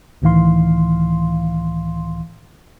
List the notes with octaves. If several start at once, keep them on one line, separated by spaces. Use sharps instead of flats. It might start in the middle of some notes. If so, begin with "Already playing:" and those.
C#2 A2 D#3 E3 F5 C6